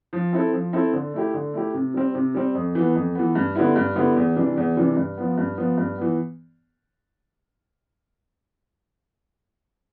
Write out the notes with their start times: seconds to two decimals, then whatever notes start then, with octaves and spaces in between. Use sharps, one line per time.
0.13 F3
0.33 C4 E4 A4
0.53 F3
0.73 C4 E4 A4
0.93 D3
1.14 A3 E4 G4
1.34 D3
1.54 A3 E4 G4
1.74 C3
1.94 G3 C4
2.15 C3
2.35 G3 C4
2.55 F2
2.75 E3 B3
2.95 F2
3.15 E3 B3
3.35 G2
3.55 D3 G3 B3 E4
3.76 G2
3.96 D3 G3 B3 E4
4.16 E2
4.36 C3 E3 G3 D4
4.57 E2
4.77 C3 E3 G3 D4
4.97 G2
5.17 F3 B3
5.38 G2
5.58 F3 B3
5.78 G2
5.98 E3 B3